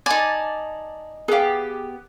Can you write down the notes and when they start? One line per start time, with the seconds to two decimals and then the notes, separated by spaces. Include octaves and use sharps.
0.06 D#4 D5 G#5 A5
1.28 B3 G4 G#4 F5